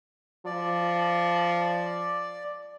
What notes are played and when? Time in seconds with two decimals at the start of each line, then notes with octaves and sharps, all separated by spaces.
0.46 F3 D5